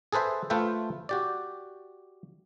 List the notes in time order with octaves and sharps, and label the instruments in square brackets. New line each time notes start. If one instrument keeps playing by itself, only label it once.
[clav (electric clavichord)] G#4 A4 B4 C5 E5
A3 F4 B4 C5 E5 G5
F#4 G4 D5